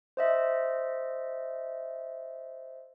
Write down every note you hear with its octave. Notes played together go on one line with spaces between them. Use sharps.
C5 D#5 E5